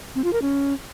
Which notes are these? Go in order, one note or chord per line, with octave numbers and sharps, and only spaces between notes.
C4
F4
A#4
C#4